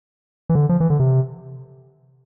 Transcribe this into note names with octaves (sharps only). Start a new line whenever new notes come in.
E3
D3
F3
E3
D3
C3